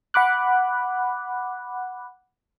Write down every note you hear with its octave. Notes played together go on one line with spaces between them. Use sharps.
F#5 B5 D6 F#6